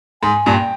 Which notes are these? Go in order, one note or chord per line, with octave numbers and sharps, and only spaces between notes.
G#2 G#5
G2 A#2
G5